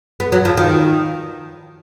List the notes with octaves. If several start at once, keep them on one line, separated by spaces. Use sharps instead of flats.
B3
F#3
F3
D#3